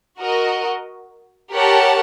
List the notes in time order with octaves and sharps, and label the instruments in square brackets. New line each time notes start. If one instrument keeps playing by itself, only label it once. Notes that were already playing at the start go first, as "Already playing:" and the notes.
[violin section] F#4 A#4 D#5
G4 A#4 C#5 F#5 A5